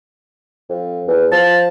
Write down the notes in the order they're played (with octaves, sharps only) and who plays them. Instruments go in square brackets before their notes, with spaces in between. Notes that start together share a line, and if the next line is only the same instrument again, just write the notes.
[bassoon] F2
E2
[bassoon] F3 [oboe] A5